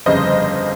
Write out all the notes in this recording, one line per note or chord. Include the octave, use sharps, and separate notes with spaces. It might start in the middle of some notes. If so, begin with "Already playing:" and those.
G1 F2 C#3 C5 D#5